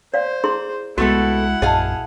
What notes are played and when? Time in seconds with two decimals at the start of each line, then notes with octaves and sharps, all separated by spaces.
0.14 C5 D5 F5
0.44 E4 G#4 C6
0.98 C2 G#3 A3 B3 E4 F#4 A4 F#5
1.62 A#1 F#2 A#2 G#4 D#5 F5 A5